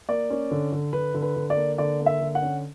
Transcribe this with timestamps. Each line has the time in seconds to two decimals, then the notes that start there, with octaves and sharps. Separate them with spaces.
0.09 A#3 D5
0.30 C#4
0.51 D3
0.72 D3
0.93 D3 B4
1.14 D3
1.22 B4
1.36 D3
1.50 D5
1.57 A#3
1.78 D3 D5
2.00 A#3
2.06 E5
2.21 D3
2.35 F#5
2.42 C#4